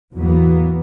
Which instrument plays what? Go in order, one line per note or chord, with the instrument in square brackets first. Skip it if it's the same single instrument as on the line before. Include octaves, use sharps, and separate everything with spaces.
[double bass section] E2 A2 E3 F#3 A#3 B3